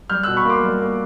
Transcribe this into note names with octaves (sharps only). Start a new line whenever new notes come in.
G3 F6 G6
B2 E6 F#6
B5 C#6
A#3 C6 D6
G3
A#3